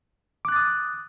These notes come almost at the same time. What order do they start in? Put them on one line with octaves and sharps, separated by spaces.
D6 F#6 A6 D#6